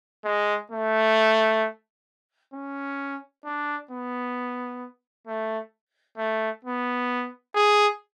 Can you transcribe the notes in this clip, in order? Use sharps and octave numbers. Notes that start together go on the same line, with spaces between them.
G#3
A3
C#4
D4
B3
A3
A3
B3
G#4